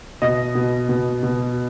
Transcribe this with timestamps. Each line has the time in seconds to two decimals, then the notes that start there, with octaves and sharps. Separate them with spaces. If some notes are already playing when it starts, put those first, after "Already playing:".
0.22 B2 D#5
0.55 B2
0.89 B2
1.23 B2